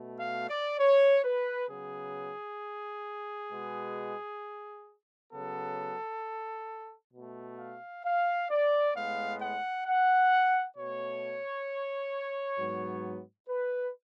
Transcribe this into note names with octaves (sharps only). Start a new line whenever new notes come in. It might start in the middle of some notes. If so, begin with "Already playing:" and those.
Already playing: B2 A3
F5
D5
C#5
B4
C#3 F#3 B3 G#4
B2 G#3 B3
C#3 F#3 B3 A4
B2
A3
F5
F5
D5
A2 G#3 B3 F5
F#5
F#5
B2 A3 C#5
G#2 F#3 B3
B4